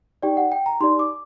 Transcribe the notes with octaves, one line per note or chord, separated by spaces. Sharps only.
D#4 G4 D5 G5
F#5
G5
A#5
D#4 G4 D5 C6
D6